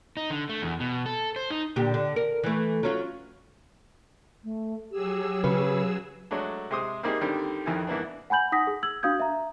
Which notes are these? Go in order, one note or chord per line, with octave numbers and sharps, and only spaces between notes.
D#4
D3
A3
E2
B2
A4
C5
D#4
A#2 D3 G4
D3
A#4
E3 A3
F#3 C#4 F4
A3
F#3 G4 G#4 E6
C#3 C#4 B4
F#3 G#3 A3 D4
C3 G#3 C5 C6 D#6
G3 A#3 C4 D#4 G4 G#4
D3 D#3 G3 C4
F2 D#3 E3 G#5
G#2 E3 A#3 B3 D4
F#5 G#5 B5 G6 F#7
D#4 F#5 D#6 A#6 B6
G#4
E6 G#6 F#7
D4 F#4 F5 D#6 G6 G#6
E5 A#5